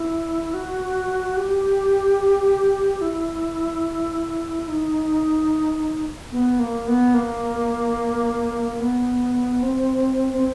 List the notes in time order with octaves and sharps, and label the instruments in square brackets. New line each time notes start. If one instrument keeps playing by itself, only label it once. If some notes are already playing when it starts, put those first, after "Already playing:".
Already playing: [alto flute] E4
F#4
G4
E4
D#4
B3
A#3
B3
A#3
B3
C4
C4